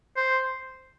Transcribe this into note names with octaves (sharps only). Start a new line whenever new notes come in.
C5